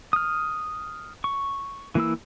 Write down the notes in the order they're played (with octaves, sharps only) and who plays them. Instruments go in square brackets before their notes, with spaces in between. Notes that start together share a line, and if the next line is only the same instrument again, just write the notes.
[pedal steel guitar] D#6 F6
C#6
E3 A#3 E4 E6